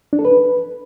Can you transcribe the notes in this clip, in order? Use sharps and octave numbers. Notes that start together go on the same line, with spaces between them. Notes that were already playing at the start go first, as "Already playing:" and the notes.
D4
A4
B4